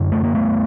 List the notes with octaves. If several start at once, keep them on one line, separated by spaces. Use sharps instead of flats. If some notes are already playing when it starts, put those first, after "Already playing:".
Already playing: F#2 D3
A3
A#3
A3 B3